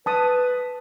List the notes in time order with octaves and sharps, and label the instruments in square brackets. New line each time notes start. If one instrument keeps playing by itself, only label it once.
[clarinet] B4 [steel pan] A5 D#6